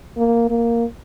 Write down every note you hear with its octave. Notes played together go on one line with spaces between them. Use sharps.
A#3
A#3